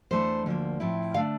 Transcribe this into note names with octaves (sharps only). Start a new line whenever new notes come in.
E2 E3 A3 D4 C5
D2 D3 F3 A#3
A2 F3 C4 E4
D3 A3 D4 F5